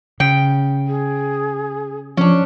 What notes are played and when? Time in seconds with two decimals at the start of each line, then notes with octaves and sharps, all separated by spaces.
0.20 C#3 G5
0.86 G#4
2.17 F3 C#4 D4